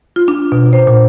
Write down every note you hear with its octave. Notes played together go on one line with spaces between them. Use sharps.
F4
D4
B2
C5
A#2